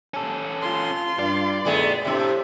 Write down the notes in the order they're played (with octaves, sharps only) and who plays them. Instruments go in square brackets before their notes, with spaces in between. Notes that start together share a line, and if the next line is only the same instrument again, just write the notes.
[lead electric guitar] C#4 A4
[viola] F4 C6
[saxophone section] G2 [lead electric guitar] D5
[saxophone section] B2 A3 [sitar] D#3 G#3 B3
[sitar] A2 C3 [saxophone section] D4 E5